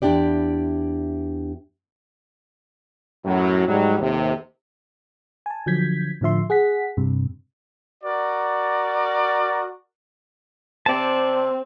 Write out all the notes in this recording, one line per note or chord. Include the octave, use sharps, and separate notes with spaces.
E2 B2 D4 E4 G4 D5
F#2 A2 F#3
G#2 F#3 G3
D#2 A2 C3
G#5 A5
D3 F3 F#3 G6 G#6 B6
A2 D3 F3 E5 C6
G#4 F#5 B6
G2 C3
F#4 A#4 D5
C3 C4 D5 A5